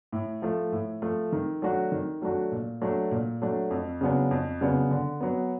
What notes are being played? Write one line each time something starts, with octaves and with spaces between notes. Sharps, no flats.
A2
F3 A3
A2
F3 A3
D#3
F#3 A3 D4 F#4
D#3
F#3 A3 D4 F#4
A#2
F#3 A3 D4
A#2
F#3 A3 D4
F2
C#3 F#3 B3 D4
F2
C#3 F#3 B3 D4
D3
F#3 B3